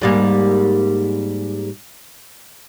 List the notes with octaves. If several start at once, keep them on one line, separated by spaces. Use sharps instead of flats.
G#2 G3 A#3